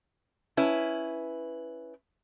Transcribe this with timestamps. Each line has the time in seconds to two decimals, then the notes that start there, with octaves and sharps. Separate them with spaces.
0.57 C#4 E4 B4